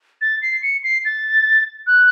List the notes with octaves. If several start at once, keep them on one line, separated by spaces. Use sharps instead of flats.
A6
C7
C#7
C7
A6
F#6